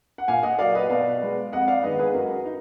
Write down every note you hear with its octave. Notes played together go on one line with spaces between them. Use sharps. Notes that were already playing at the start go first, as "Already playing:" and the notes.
F#5
A#2 F5 G#5
D#5 F#5
F#3 A#3 D5 F5
B4 D#5
B2 D5 F5
G#3 B3
F2 D#5 F#5
D5 F5
D#3 G#3 B3 B4 D#5
G#4 B4
F#2 F#4 A#4
D#4